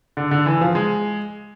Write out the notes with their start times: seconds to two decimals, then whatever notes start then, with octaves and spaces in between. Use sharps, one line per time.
0.17 D3
0.31 D3
0.46 E3
0.61 F3
0.75 G#3